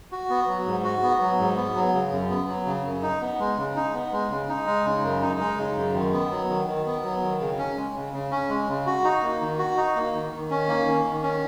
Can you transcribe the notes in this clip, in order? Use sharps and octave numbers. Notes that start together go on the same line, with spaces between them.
F#4
B3
F#3
G#2
F#4
B3
F#3
G#2
B3
F#3
C#3
F#2
B3
F#3
C#3
F#2
D#4
B3
G#3
C#3
D#4
B3
G#3
C#3
D#4
G#3
C#3
F#2
D#4
G#3
C#3
F#2
D#3
B3
F#3
D#3
D#3
B3
F#3
D#3
C#3
C#4
G#3
C#3
C#3
C#4
G#3
C#3
F#4
D#4
A#3
D#3
F#4
D#4
A#3
D#3
D#3
C#4
A#3
D#3
D#3
C#4